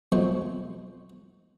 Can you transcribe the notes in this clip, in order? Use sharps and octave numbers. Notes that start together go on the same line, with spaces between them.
B1 F2 G#3 C5 C#6